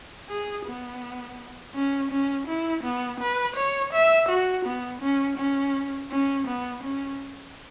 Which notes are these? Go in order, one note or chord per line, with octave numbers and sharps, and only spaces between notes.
G#4
B3
C#4
C#4
E4
B3
B4
C#5
E5
F#4
B3
C#4
C#4
C#4
B3
C#4